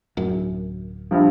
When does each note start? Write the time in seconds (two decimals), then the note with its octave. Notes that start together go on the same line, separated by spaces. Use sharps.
0.17 D1 F#2
1.11 A#1 G2 F3